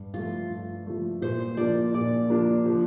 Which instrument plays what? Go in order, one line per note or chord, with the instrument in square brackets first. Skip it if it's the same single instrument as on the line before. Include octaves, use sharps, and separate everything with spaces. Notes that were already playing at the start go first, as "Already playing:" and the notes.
Already playing: [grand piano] G2
[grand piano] F3 A3 [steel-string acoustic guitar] F4
[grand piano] G2
F3 A3
[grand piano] A#2 [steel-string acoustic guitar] C5
[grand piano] F3 A#3 D4 [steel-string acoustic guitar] D5
[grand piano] A#2 [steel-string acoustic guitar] D5
[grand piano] F3 A#3 D4
F3